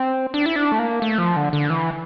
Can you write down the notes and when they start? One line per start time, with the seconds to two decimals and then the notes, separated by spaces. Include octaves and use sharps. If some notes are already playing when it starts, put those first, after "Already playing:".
Already playing: C4
0.34 D4
0.46 E4
0.56 D4
0.72 A3
0.79 A#3
1.02 A3
1.18 F3
1.36 D3
1.53 D3
1.70 E3